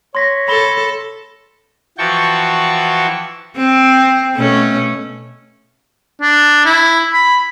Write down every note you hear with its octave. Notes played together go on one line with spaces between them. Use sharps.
C#5 C6 A#6 B6
A4 B5 A#6 G7
E3 F3 F#4 G5 A5 C#6
C4
B2 A3 C#4
D4
E4
B5